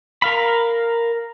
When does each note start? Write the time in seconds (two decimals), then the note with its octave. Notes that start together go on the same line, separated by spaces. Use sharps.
0.22 A#4 F5 B5